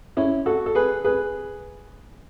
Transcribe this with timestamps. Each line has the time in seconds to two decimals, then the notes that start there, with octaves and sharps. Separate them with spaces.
0.17 C#4 E4
0.46 F#4 A4
0.66 A4
0.75 G#4 B4
1.04 G#4 B4